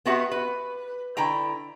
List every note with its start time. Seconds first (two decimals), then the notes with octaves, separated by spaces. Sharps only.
0.05 B3 C4 F#4 G4 E5 F#5
0.31 B4
1.17 D3 E4 G5 A#5